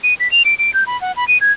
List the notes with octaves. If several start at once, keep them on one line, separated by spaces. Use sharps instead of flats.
D#7
B6
F7
D7
D7
G6
B5
F#5
B5
D#7
G#6